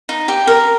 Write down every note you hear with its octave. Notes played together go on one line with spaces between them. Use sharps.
D#4
G4
A#4